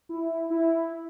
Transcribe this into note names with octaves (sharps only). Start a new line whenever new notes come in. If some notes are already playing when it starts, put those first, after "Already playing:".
E4
E4